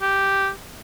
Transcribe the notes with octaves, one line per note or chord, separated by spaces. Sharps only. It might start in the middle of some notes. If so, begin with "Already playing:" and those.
G4